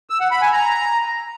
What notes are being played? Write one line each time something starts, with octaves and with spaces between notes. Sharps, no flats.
E6
F#5
B5
G#5
A#5